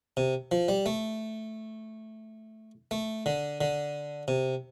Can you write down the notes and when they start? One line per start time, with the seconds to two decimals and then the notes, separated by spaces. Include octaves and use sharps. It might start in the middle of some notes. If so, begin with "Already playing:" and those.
0.17 C3
0.52 F3
0.68 G3
0.86 A3
2.91 A3
3.26 D3
3.61 D3
4.28 C3